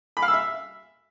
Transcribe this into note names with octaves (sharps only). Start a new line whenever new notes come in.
B5
F5
E6
E5